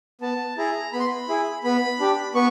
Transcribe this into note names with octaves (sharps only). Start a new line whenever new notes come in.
B3 A5
E4 G#4 A#5
B3 B5
C6
B5
E4 G#4
B3 B5
D4 G4
B3 C#6